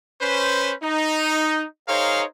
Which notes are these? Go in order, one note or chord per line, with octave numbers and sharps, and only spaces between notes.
C#4 B4 C5
D#4
D#4 G#4 A#4 C5 C#5 F5